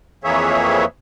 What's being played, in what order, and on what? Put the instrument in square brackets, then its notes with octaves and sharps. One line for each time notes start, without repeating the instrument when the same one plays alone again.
[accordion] F2 E3 A#3 G#4 C#5 E5